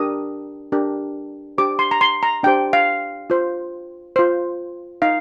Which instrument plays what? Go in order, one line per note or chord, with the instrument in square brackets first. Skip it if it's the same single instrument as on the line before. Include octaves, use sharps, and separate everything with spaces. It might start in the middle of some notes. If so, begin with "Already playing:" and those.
Already playing: [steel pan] D4 G4 A#4 D#6
D4 G4 A#4
D4 G4 C5 D6
C6
A#5
C6
A#5
D4 G4 C5 G5
F5
F4 C5
F4 C5
D#4 F5